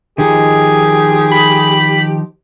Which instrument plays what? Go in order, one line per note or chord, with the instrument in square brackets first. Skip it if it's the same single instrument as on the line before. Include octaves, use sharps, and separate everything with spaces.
[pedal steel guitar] D#3 F3 D#4 [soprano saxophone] G4 [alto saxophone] G#4
[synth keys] B5